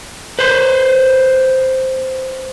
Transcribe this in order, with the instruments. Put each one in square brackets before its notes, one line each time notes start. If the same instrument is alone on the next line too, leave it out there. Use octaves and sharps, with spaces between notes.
[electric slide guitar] B4 C5